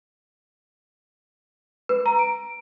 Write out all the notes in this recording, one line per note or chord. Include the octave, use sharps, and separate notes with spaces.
B4
A#5
D7